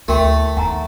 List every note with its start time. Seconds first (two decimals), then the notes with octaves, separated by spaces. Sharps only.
0.08 D2 A3 E4 F#4 A#4 G5
0.57 D#2 F3 F#5 G#5 A#5